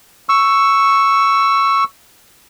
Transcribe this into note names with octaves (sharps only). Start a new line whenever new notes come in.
C#6 E6